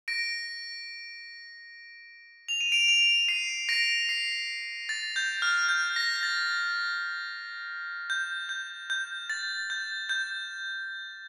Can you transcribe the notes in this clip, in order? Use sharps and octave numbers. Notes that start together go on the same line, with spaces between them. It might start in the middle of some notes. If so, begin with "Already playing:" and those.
A#6 D7
F7
D#7
D7 F7
D7 F7
C7 D#7
A#6 D7
C7
A6
G6
F6
G6
A#6
A#6
A6
G6
G6
G6
A6
G6
G6